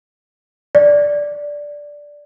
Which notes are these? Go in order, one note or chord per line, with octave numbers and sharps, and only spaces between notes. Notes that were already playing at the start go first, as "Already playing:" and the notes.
D5